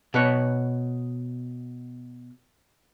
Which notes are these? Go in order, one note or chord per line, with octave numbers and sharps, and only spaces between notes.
B2 B4 C#5